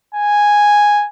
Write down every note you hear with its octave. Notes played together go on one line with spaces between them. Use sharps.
G#5